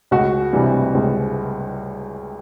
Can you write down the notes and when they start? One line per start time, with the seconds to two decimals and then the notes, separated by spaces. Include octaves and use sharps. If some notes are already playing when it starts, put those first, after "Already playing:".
0.11 C#2 F#4
0.53 C3 E3 G3
0.95 C#2